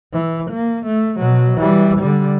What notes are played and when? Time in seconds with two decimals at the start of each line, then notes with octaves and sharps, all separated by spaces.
0.13 E3
0.51 A#3
0.86 A3
1.19 B2 F#3
1.58 E3 G3
1.99 D3 G3